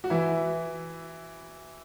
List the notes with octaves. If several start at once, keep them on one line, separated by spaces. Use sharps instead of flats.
F#4
E3 E4